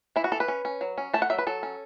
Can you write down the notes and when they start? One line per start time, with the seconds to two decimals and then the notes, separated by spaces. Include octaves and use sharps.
0.16 E3 E4
0.24 F#4
0.32 E3 A4
0.40 B4
0.48 C#4
0.65 C#4
0.81 F#3
0.98 C#4
1.14 A3 A5
1.22 F#5
1.30 F#3 E5
1.38 B4
1.47 F#3 A4
1.63 C#4